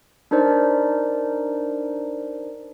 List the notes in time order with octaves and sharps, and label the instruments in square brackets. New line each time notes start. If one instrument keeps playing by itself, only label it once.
[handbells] D4 D#4 A#4 C5 D5